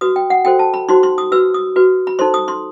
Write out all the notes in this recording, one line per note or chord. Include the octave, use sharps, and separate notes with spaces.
F#4 B4 D#6
G5
F#5
F#4 A4 C5 G5
A5
B5
D#4 F#4 C5 C6
C6
D#6
F#4 B4 E6
D#6
F#4 B4
B5
D#4 A4 C5 C6
D#6
C6